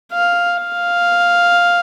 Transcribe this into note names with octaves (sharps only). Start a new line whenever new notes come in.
F5
F5